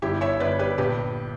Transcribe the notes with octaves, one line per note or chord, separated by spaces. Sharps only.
G1 E4 G4
C#5 E5
G1 B4 D5
G4 B4
A#1 G4 B4